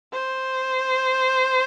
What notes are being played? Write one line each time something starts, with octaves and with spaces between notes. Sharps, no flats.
C5